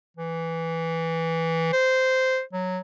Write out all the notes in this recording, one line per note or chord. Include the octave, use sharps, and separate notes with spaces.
E3
C5
F#3